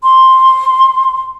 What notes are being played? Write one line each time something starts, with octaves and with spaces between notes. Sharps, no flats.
C6